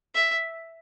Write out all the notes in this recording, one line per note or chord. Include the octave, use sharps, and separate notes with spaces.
E5